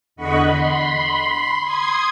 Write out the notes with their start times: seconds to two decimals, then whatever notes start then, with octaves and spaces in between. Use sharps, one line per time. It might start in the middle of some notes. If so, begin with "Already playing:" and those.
0.16 E2 D3 D#5 F#5 B5 C#6
0.47 B5 C6
1.62 C6 D#6 G#6